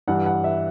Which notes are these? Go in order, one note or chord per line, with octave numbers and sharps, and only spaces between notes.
G2 E3 F#5
F#5
E5